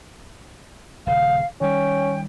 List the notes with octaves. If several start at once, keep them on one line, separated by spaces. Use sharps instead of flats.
D#1 C#3 F5
D#3 G3 C#4 G5